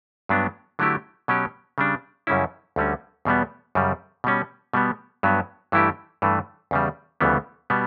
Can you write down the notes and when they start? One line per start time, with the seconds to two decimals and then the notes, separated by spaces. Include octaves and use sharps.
0.29 G2 F#3 B3 D4
0.79 D3 F#3 A3 E4 G4
1.28 B2 F#3 C#4 G4
1.78 C#3 G3 D4
2.27 F#2 C#3 G3 C#4 E4
2.76 D2 D3 G3 C#4
3.25 E2 B2 G3 B3
3.75 F#2 C#3 G3
4.24 B2 G3 C#4
4.73 B2 G3 B3
5.23 G2 F#3 B3
5.72 G2 E3 A3 E4 G4
6.22 G2 E3 A3
6.71 E2 C#3 G3
7.21 D2 C#3 E3 G3 B3
7.70 B2 G3 B3